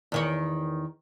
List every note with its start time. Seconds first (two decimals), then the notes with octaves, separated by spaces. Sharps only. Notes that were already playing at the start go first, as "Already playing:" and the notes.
0.12 E2 D#3 C#5